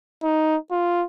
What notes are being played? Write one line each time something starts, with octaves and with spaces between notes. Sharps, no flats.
D#4
F4